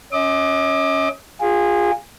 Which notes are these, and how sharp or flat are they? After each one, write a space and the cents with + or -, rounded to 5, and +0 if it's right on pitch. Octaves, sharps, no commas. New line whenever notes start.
C#4 +0 D#5 +40 D6 +25
F4 +10 G#4 -20